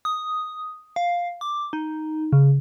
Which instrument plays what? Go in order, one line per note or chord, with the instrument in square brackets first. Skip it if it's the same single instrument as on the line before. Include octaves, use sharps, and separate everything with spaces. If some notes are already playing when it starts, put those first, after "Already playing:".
[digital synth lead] D#6
F5
D6
D#4
C#3